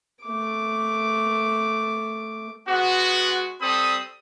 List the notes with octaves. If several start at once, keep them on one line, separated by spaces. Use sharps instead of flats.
A3 D6
G#3 B3 F#4
G3 C4 A4 B5 D#6